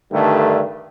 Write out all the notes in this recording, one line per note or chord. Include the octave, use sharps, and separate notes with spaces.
G2 D3 D#3 G3 A3